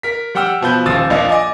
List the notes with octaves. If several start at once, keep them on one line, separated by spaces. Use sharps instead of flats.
A#4 B6
G3 F#5 G5 E6 F6
B2 F3 B4 G6
D#1 D#2 F3 D#6 E6 A6
A#1 A#3 D4 D#5 F5
D#5 G#5 D6